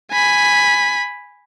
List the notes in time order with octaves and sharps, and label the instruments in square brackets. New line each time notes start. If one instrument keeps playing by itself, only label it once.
[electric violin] G#5 B5